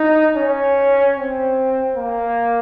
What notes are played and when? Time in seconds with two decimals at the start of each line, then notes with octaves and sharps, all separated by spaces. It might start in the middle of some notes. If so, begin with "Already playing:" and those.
Already playing: D#4
0.37 C#4
1.16 C4
1.96 A#3